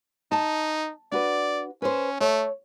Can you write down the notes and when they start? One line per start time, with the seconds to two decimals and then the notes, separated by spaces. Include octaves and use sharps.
0.32 D#4 A5
1.12 D4 F#4 B4 D5
1.82 C#4 B4 C5
2.21 A3 C#5